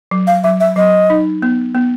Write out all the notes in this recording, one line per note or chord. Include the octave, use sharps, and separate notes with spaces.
F#3
F5
F#3 E5
E5
F#3 D#5
D#4
B3
B3